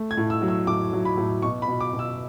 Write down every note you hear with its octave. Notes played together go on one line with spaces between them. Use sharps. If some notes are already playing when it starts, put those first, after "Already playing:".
Already playing: A3
G#6
A2
E6
F#3
E6
A2 D6
F#3
B5
A2
B2 C#6
B5
B2
D6
B2
E6